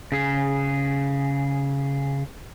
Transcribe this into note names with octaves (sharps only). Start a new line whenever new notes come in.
C#3 G#4